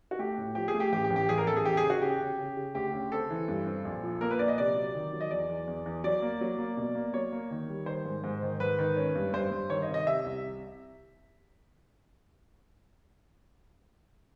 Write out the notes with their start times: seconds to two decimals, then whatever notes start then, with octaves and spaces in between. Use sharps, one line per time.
0.11 F#4
0.19 A3 G4
0.38 A2
0.55 F3 G4
0.68 G#4
0.74 A3
0.80 G4
0.92 A1 G4
1.04 G4
1.10 A1
1.16 G4
1.29 A1 G#4
1.38 A#4
1.47 A1 A4
1.57 G#4
1.65 E1 G4
1.77 G#4
1.83 C#3
1.90 F#4
2.02 C#3 G4
2.20 C#3
2.38 C#3
2.57 C#3
2.75 D2 G4
2.93 C#3
3.12 C4 A4
3.30 E3
3.48 G2
3.66 C4
3.85 A#1
4.03 F3
4.21 A#3 A#4
4.31 B4
4.39 A#1 D5
4.48 D#5
4.58 C3 D5
4.76 F#3
4.94 D#3
5.13 F#3
5.21 D#5
5.31 E2 D5
5.49 E2
5.67 E2
5.86 E2
6.04 F#3 D5
6.22 A#3
6.41 F#3
6.58 A#3
6.77 B2
6.95 A#3
7.14 F#3 C#5
7.32 A#3
7.51 D#3
7.69 G3
7.86 D#3 C5
8.05 G#2
8.24 G#2
8.42 D#3
8.60 G#2 B4
8.78 D#3
8.96 C#4
9.15 G2
9.33 G2 C5
9.51 G2
9.69 D#3 C#5
9.82 D#5
9.88 C3
9.94 D#5
10.07 C3 E5
10.25 C2